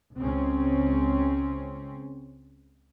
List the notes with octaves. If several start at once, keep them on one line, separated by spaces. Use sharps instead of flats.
C#2 C4 C#4